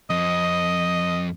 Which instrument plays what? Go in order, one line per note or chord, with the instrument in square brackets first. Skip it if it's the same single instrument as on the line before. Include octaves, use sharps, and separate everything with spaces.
[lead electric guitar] F2 [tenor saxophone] D#5